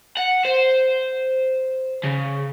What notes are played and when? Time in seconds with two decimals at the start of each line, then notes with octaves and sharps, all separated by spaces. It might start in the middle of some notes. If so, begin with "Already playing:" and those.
0.17 F#5
0.45 C5
2.04 C#3